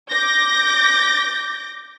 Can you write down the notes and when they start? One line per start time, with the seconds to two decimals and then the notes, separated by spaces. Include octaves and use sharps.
0.11 D6 G6 A#6